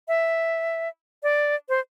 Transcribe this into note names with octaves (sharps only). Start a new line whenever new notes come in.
E5
D5
C5